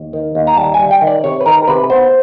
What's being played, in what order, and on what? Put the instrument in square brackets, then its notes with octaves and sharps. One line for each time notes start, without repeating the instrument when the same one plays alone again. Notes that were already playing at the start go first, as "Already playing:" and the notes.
Already playing: [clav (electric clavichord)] D#2
D#3
D#2
A#5
G3 A5
G3 G#5
G5
D#3
D5
C3 C#5
B4
D#3 A#4
C3 B4
B3 C5